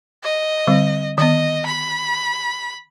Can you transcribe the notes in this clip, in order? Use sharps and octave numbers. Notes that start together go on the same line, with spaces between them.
D#5
D3 G3 C4
D#3 B3 D#5
B5